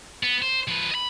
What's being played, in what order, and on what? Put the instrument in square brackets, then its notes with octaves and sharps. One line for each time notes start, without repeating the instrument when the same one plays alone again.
[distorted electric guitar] B3
C5
F3 B4
D#5 B5